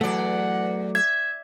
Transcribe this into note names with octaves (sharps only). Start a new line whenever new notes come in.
E2 F#3 A3 D5 F#5
E5 G#6